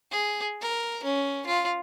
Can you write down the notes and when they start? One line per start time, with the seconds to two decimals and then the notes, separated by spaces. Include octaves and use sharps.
0.12 G#4
0.61 A#4
1.04 C#4
1.46 F4